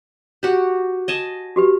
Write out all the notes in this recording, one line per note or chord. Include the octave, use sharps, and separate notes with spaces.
F#4 G4
D#5 G#5 A5
F#4 G4 B4